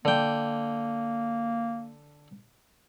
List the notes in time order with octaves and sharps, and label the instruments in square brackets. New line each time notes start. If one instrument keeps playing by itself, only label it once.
[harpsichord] D3 G5 [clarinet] A#3